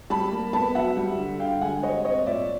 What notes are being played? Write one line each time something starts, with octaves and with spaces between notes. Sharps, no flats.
G3 A5 B5
A#3
B3 A5 B5
F#3 E5 F#5
G3
D3
D3 F5 G5
G#3 F#5 G#5
G3 C#5 D#5
C4 C#5 D#5
A#2 D5 E5